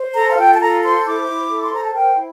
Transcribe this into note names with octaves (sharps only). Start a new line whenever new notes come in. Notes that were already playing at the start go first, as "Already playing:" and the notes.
Already playing: C5
A4 A#5
F5
F4 G5
A5
A4 A#5
C5 C6
E4 D6
E4
A4
C6
C5 A#5
A5
A#4 G5
E4